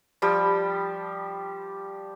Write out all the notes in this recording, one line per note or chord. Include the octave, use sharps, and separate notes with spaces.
F3 G3 G4